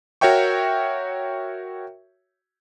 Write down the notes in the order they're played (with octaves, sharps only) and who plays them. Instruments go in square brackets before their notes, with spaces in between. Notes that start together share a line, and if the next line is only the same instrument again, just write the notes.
[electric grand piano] F#4 A#4 C#5 E5 G5 C#6